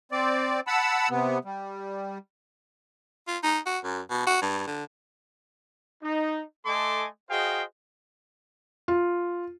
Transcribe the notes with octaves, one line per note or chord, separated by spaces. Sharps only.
C4 D5
F#5 A5 B5 E6
C3 B3
G3
F4
D#4
F#4
F#2
B2
F#4
G2
D3
D#4
A3 A4 D#5 G#5 C6 D6
F#4 G#4 C5 D#5 F5 G5
F4